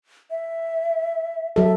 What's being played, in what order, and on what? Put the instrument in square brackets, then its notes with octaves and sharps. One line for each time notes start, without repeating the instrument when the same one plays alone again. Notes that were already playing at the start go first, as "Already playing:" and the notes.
[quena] E5
[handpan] F#3 A4 [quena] E5